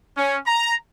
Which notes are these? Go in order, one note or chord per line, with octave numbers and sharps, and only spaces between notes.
C#4
A#5